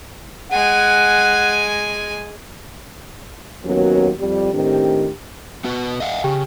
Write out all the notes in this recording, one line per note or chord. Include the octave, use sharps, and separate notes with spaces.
G#3 F#5 G#5
D#2 F#3 B3 C#4 F#4 A#4
F2 G3
A2 D#3 C4 D4 G4
B3 F#4 B4
D#5 F5 F#5
C#3 G4 G5